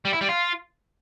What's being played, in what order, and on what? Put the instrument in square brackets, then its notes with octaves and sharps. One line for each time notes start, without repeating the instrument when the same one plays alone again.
[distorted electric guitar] G3
E4
G3
F4